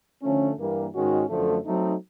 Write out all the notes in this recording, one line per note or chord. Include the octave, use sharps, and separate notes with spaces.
D3 F3 A3 C#4
G2 E3 G3 A#3
G#2 D#3 G#3 C#4 F#4
F#2 D3 F3 A3
F#3 A3 C4 D#4